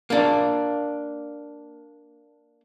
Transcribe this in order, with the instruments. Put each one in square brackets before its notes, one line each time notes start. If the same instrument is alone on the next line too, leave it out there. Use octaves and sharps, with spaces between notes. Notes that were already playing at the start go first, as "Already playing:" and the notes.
[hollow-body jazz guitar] A#3 D4